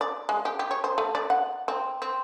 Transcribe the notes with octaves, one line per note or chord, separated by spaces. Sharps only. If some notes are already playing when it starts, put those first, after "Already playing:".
D5
G#3
G4
G4
C#5
C5
A3
D5
F#5
C4
C4